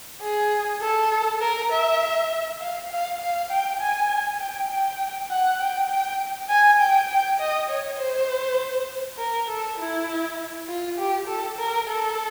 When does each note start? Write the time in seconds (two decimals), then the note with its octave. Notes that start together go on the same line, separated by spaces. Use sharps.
0.21 G#4
0.82 A4
1.41 A#4
1.71 E5
2.61 F5
2.91 F5
3.20 F5
3.50 G5
3.81 G#5
4.40 G5
4.70 G5
5.30 F#5
5.60 G5
5.90 G5
6.49 G#5
6.80 G5
7.09 G5
7.39 D#5
7.69 C#5
7.98 C5
9.18 A#4
9.48 A4
9.79 E4
10.68 F4
10.98 G4
11.27 A4
11.58 A#4
11.88 A4